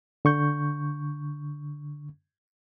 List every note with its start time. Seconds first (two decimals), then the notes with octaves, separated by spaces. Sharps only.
0.25 D3 C#6 G6